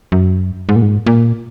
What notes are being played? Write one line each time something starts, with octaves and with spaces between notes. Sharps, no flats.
F#2
G#2
A#2
G#2
A#2